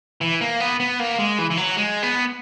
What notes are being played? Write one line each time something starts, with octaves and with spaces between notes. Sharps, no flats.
E3
A#3
B3
B3
A#3
G#3
E3
E3
F#3
G#3
B3